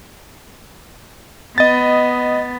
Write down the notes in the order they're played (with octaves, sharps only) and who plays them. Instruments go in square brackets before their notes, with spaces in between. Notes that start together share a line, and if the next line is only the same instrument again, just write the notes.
[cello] B3 [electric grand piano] D#5 A6